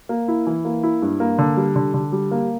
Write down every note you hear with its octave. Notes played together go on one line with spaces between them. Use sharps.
A#3
E4
E3
A#3
E4
G2
A#3
D3
G3
D3
D3
G3
A#3